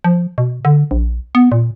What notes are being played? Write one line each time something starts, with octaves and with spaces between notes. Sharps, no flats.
F3
B2
D3
A#1
B3
A#2